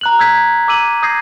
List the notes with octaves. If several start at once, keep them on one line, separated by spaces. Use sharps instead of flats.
A#5 F#6 F#7
E6 G6 G#6 B6
A#5 D6 E6 D#7 F#7
D#6 G6 G#6 A#6 C7